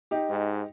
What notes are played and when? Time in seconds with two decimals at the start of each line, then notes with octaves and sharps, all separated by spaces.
0.11 D#4 G4
0.30 G#2